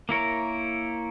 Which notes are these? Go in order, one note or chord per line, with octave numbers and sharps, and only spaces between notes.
A#3 E4 A#4 C#5